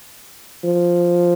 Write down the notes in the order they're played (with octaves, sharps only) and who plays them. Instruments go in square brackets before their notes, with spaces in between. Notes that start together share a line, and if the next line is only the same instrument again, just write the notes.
[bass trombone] F3